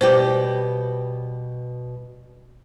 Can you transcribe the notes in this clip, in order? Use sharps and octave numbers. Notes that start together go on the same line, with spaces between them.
B2 G3 G4 C5